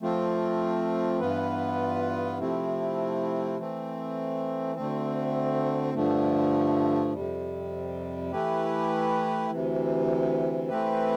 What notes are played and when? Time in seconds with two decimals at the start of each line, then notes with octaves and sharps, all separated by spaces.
0.01 F3 A3 C4 F4
1.20 G2 E3 B3 F4 B4
2.39 C3 F3 A3 C4 E4
3.58 E3 A3 C4
4.76 D2 D3 A3 C4
5.94 G2 D3 F3 A3
7.13 F2 C3 G3
8.32 E3 A3 E4 G4 B4
9.50 D2 C3 E3
10.69 E3 A3 C4 G4 B4